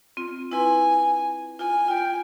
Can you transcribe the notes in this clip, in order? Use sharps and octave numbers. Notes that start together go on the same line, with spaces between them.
C4 F4
E4 B4 G#5 C6
F4 G#5
F4 G5